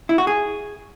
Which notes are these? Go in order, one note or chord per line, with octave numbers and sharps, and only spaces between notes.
E4
F#4
G#4